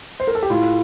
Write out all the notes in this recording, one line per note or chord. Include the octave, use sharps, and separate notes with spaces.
C5
A#4
A4
G4
A2 F4